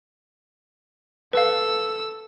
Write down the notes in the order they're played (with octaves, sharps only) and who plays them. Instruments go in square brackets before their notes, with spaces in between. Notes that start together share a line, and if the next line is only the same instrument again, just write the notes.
[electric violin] A4 E6 [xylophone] B4 F5